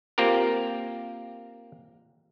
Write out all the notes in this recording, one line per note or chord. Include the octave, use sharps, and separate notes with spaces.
A#3 C4 F4 G4 A#4